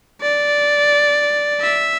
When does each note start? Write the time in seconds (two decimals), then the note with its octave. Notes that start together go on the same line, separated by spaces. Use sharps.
0.22 D5
1.61 E5